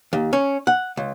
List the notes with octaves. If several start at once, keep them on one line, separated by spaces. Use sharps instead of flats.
D#2
C#4
F#5
C#2